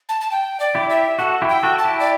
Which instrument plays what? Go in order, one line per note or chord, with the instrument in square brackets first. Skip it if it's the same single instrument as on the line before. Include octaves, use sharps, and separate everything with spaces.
[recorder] A5
A5
G5
D5
[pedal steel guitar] E4 G4
[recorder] E5
[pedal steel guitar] F#4 A4 [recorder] F#5
[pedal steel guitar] E4 G4
[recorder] G5
[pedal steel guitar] F#4 A4
[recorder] A5
[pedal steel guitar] E4 G4
[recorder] D5